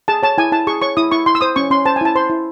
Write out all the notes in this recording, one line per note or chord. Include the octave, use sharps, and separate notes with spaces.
G#4 A5
C#5 A5
E4 G#5
E4 A5
G#4 C#6
C#5 C#6
E4 D#6
E4 C#6
E4 C6
E6
C5 D#6
C#4 C#6
C#4 C6
C5 A5
G#5
E4 A5
C5 C6
E4